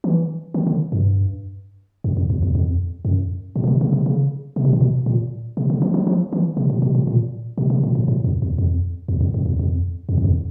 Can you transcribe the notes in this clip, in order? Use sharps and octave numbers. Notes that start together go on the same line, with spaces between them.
E3
D#3
D3
G2
F#2
F2
E2
E2
F2
F#2
A#2
C3
B2
C#3
C3
C#3
C3
B2
A#2
B2
A#2
C3
C#3
E3
F3
F3
E3
C3
A#2
B2
A#2
A#2
B2
C3
A#2
A2
A2
F2
E2
F2
E2
F2
F#2
E2
F2
F2
F#2
F2